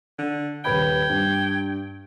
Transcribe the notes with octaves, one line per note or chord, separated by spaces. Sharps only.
D3
D#1 B4 G5 B5 G#6
G2